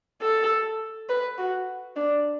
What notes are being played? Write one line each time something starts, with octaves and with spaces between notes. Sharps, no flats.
A4
B4
F#4
D4